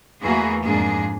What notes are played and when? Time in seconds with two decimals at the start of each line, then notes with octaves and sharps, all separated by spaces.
0.22 E2 E3 A3 A#3 F#4 G#4
0.63 F2 G#2 A#3 D4 G#4